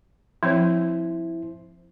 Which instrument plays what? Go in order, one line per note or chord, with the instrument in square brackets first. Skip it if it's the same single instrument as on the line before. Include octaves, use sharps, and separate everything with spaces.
[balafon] F3 C4 C#5 [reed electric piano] E4 C5